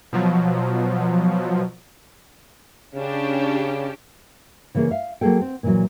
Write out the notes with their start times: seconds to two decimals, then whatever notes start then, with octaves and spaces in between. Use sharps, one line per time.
0.13 B2 F3 F#3
2.95 C#3 C#4 D4 G4
4.75 C#3 E3 A#3 D4 G#4
4.90 E5 F5
5.21 F#3 A#3 F#4 G#4 A4 G5
5.41 C4
5.63 A#2 E3 F#3